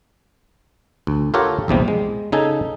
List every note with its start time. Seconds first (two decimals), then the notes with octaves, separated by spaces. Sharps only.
1.07 D2
1.34 F4 G4 A4 A#4 C#5 F#5
1.68 A#1 E2 C3 G3
1.88 G#3
2.32 C#3 D#4 A4 G#5